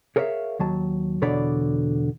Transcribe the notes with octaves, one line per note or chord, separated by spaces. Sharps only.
G#4 A#4 C#5 D5 E5 F5
D#2 F#3 A5
E2 B2 D3 C#5 D5 B5